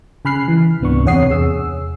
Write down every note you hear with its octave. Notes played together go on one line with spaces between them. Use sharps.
C#3 G#5 B5 F6 F#6 C7
E3
C#2 G#2 C3 B3 D4 C#6
E2 C3 C#5 F#5 D#6 C7
E2 G#4 E6